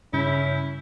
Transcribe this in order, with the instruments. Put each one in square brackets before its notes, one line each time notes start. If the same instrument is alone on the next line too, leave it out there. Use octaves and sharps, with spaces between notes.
[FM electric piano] G2 C#3 G6 [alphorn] C#4 [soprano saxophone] E4